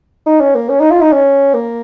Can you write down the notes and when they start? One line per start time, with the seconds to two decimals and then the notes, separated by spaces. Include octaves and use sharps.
0.26 D#4
0.40 C#4
0.55 A#3
0.69 C#4
0.80 D#4
0.90 F4
1.01 D#4
1.12 C#4
1.54 A#3